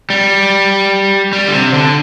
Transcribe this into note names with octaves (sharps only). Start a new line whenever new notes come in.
G3
G3
D3
C3
D3